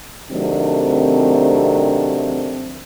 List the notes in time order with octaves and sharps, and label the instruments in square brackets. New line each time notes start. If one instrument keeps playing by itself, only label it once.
[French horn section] C3 D#3 F#3 A3 C4 D4